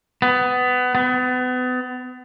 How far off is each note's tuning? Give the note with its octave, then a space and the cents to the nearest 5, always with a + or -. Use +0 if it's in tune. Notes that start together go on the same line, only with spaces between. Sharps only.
B3 +20
B3 +35